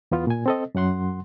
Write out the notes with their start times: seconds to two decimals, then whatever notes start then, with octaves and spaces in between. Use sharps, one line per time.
0.11 E2 B3 F4
0.27 A#2 G#5
0.46 C4 A4 D#5
0.75 F#2 F#3 F#5 C6